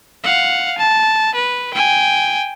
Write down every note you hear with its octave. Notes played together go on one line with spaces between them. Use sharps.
F5 F#5
A5
B4
G5 G#5